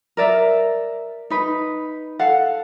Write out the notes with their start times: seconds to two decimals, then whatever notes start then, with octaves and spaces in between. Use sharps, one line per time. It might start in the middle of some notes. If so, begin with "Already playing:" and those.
0.17 A#4 D5 E5
1.30 D#4 B4
2.19 A4 F5 F#5